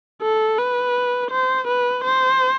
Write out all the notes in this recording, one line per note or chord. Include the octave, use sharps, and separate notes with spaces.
A4
B4
C5
B4
C5